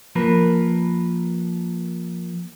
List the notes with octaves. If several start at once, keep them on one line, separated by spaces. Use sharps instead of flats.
F3 A#3 A#4 B4